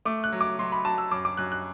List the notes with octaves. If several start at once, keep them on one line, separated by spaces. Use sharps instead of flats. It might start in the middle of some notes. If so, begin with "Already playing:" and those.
A3 D6
F#6
F#3
D6
F#3 C6
B5
F#3 A5
E6
F#2 D6
D6
F#2 F#6
F#6